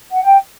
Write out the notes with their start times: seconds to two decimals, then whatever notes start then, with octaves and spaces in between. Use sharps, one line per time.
0.11 F#5
0.22 G5